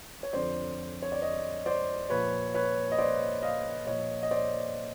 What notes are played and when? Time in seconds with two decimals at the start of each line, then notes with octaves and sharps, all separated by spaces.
0.23 C#5
0.33 F2 D3 F3 C5 D5
1.02 C#5
1.12 D5
1.22 C#5 D#5
1.66 C5 D5
2.10 A#2 F3 B4 C#5
2.54 B4 C#5
2.92 D#5
2.98 C5 D5
3.42 D#5 F5
3.87 A#2 F3 C#5 D#5
4.23 D#5
4.31 C5 D5